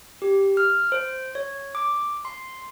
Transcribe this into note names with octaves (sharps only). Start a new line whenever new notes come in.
G4
F6
C5
C#5
D6
C6